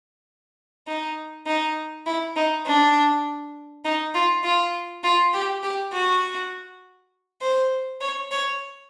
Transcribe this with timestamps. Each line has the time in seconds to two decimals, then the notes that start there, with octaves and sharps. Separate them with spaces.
0.87 D#4
1.46 D#4
2.06 E4
2.36 D#4
2.66 D4
3.85 D#4
4.14 F4
4.44 F4
5.04 F4
5.33 G4
5.63 G4
5.93 F#4
7.41 C5
8.01 C#5
8.31 C#5